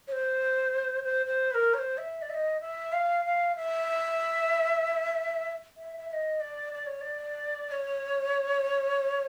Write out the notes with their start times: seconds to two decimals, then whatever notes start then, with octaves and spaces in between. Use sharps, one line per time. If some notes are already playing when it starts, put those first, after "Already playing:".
0.08 C#5
0.12 C5
1.03 C5
1.26 C5
1.51 B4
1.54 A#4
1.74 C#5
1.78 C5
1.98 E5
2.22 D5
2.30 E5
2.34 D#5
2.61 E5
2.93 F5
3.25 F5
3.56 E5
5.77 E5
5.98 E5
6.09 E5
6.13 D#5
6.41 D5
6.73 D5
6.86 C#5
7.01 D5
7.68 D5
7.72 C#5